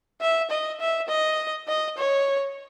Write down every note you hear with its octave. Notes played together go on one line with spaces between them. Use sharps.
E5
D#5
E5
D#5
D#5
C#5